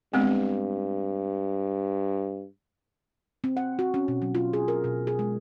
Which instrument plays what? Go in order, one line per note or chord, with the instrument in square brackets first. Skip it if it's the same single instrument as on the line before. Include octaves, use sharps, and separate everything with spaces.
[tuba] G2 [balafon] G#3 B3 C4
[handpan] C4
F#5
F#4
C#4
B2
F#3
F4
G#4
A#4
B2
G#4
G#3